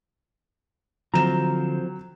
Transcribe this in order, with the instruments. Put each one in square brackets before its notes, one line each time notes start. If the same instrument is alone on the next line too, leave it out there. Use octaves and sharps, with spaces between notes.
[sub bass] D3 [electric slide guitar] F3 C4 [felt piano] F#3 E7 [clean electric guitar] A#5